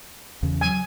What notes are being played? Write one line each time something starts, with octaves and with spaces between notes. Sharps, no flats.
E2 C#3
F#3 G#5